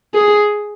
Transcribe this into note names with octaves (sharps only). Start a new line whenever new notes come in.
G#4